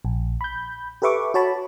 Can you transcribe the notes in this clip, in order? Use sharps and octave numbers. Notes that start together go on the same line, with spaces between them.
A#1
B5 G6
G4 A4 B4 E5 C#6 D6
F#4 C#5 A5 B5